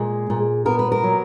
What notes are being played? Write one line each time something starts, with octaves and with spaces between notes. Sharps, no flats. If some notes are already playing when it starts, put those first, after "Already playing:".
Already playing: A#2 G#3 G#4
A#2
B3 A#4
B4
A#4
F#3